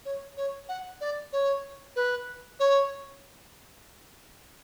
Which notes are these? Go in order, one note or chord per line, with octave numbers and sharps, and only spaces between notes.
C#5
C#5
F#5
D5
C#5
B4
C#5